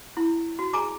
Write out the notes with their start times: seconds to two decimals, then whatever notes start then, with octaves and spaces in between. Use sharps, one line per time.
0.17 E4
0.59 F#4
0.73 G#4 G#5 A#5 D6